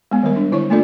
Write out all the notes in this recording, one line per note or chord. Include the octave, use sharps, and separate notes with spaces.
G#3 B3
D#3 G3 A#4
D4
D3 E4 C#5 C#6
A3 A#3 D4 F4 A4 D5